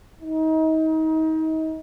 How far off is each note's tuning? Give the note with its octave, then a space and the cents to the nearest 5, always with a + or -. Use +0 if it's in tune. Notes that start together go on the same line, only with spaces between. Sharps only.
D#4 +30